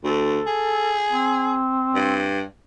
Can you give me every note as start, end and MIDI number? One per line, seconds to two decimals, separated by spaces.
0.04 0.40 38
0.04 1.05 69
0.47 1.57 68
1.12 2.29 60
1.95 2.43 43